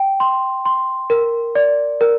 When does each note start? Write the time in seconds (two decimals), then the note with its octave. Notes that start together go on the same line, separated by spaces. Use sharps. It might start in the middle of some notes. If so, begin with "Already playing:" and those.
Already playing: G5
0.20 C6
0.65 C6
1.10 A#4
1.55 D5
2.01 A#4